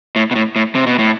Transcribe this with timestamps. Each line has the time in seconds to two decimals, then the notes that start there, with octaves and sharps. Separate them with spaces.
0.16 A2
0.31 B2
0.35 A2
0.56 A2
0.75 C3
0.87 B2
0.99 A2